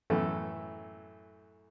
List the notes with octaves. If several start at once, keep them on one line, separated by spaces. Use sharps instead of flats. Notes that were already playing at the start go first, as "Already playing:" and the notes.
F#2 A2 E3 A3